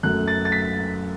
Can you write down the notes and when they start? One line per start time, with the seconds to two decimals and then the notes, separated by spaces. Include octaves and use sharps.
0.03 F#2 F#3 A3 F#6
0.28 A6
0.45 A6
0.52 B6